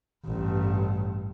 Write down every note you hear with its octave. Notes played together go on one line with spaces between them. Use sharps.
A1 G2